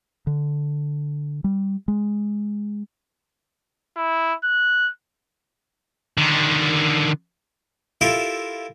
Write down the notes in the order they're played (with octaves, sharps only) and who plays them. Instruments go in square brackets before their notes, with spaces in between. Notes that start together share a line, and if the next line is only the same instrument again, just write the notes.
[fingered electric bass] D3
G3
G#3
[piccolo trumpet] E4
F#6
[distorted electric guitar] D3 D#3
[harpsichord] E4 F4 G4 A4 A#4 E5